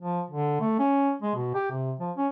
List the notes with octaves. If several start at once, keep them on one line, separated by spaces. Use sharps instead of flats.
F3
D3
A3
C#4
G#3
B2
G4
C3
F3
C#4